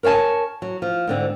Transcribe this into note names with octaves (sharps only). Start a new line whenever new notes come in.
A#4 C#5 E5 G#5 A5
F#3
F3
G#2 D3 C4